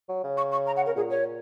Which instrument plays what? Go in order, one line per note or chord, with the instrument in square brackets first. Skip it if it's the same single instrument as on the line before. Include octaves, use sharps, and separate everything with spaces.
[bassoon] F#3
C#3
[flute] C#6
C#6
A#5
F#5
[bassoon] C#3 [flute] A#4
[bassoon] A#2 [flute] G#4
[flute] C#5